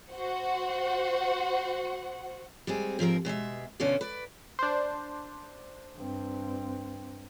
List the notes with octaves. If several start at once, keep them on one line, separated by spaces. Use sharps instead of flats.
F#4 C5 F#5
G3 G#3 C4 G#4
G#2 F3 C4 A#4
B2 G#3 D#5 E5
B2 D3 C#4 F4 C5 D5
B4 D5
D4 C5
G2 C4